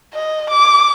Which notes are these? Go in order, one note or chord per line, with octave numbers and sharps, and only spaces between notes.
D#5
D6